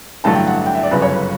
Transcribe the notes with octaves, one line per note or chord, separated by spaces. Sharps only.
A1 G2 D3 F#3 A3 A5
G5
F#5
G5
E5
D5
G1 F#2 C#3 B4
C#5
B4